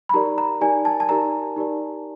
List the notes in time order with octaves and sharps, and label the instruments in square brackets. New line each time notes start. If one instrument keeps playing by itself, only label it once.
[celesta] B5
D#4 G4 A#4 D5 A#5
A#5
D#4 G4 A#4 D5 G#5
A5
A5
D#4 G4 A#4 D5 A#5
D#4 G4 A#4 D5